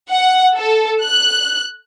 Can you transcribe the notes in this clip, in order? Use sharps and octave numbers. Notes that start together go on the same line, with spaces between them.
F#5
A4
F#6